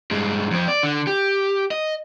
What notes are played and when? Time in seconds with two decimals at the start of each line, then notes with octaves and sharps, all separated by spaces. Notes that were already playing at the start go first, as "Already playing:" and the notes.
0.11 G2 G#3
0.51 F2 C4
0.68 D5
0.83 D3
1.07 G4
1.71 D#5